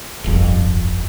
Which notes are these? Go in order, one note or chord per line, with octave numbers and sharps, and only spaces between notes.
D1 G1 F2